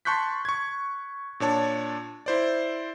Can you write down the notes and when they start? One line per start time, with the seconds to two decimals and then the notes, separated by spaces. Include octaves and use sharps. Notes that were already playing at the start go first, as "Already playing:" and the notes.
0.05 A5 C6 C#6 F#6 G6 B6
0.45 C#6 G#6
1.40 A#2 D4 C#5 A5
2.26 E4 C5 D5